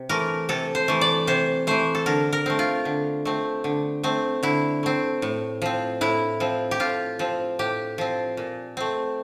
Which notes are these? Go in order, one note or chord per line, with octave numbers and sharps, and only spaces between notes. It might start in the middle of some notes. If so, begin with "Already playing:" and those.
Already playing: C3
E3 A3 A#4
C3 A4
C5
E3 A3
D5
C3 C5
E3 A3 C5
A4
D3 A#4
A#4
A3 C4
F4
D3
A3 C4
D3
A3 C4
D3 E4
A3 C4
A2
F3 C4
A2 E4
F3 C4
G4
A2 F4
F3 C4
A2 G4
F3 C4
A#2
A3 C4